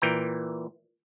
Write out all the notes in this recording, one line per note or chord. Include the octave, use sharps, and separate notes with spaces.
A#2 E3 G5 A#5